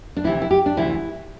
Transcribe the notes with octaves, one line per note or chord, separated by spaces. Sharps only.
D4
D2 C3 E3 E4
E4
G4
D4
D2 C3 E3 E4